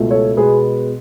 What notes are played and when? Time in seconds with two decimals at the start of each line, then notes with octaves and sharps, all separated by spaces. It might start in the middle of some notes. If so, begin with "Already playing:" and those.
Already playing: C#2 B2 A3
0.11 A4 C#5
0.37 B2 G#3 B3 G#4 B4